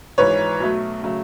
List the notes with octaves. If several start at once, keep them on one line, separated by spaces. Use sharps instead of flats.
G#1 G#2 E3 B4 C#5
B1 B2 F#3 A3
C#3 F#3 A3